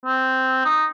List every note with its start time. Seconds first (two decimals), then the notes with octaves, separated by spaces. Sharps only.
0.05 C4
0.65 D#4